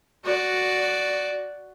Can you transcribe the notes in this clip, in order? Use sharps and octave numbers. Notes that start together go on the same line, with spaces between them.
F#4 D5